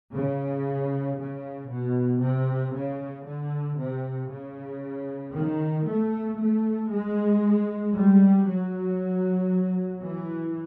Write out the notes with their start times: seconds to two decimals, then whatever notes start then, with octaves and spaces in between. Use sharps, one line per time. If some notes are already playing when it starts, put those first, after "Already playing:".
0.14 C#3
1.18 C#3
1.69 B2
2.21 C3
2.74 C#3
3.26 D3
3.78 C3
4.31 C#3
5.34 D#3
5.86 A3
6.39 A3
6.91 G#3
7.95 G3
8.47 F#3
10.02 E3